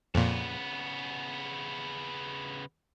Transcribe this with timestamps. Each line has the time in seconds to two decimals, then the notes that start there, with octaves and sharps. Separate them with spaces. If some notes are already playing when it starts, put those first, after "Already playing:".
0.15 F2 A#2 C#3 B3